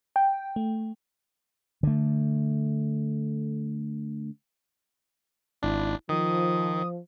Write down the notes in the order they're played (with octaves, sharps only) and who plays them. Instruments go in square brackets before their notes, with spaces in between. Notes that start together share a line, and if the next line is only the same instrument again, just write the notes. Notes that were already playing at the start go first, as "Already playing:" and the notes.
[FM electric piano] G5
A3
[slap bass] D3 A3
[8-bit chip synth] G#1 D4 [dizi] E4
[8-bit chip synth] D#3 [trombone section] F3 [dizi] D#6